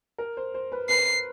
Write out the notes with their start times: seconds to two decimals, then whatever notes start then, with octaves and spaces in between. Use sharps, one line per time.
0.18 A#4
0.37 C5
0.54 C5
0.72 B4
0.89 B4 C7